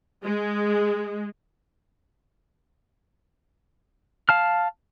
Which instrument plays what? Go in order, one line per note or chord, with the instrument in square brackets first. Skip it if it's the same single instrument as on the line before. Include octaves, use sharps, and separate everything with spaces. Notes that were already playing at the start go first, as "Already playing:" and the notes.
[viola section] G#3
[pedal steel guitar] F5 A5 F6